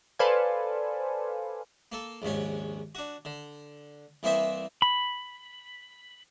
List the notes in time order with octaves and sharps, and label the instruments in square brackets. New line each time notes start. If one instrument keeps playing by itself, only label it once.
[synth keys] A4 B4 C5 D5 F5 G#5
[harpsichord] A#3 A4
A#1 D#2 G#2 C#4
D4 F#4
D3
C2 E3 A#3 C5 D#5 E5
[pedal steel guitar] B5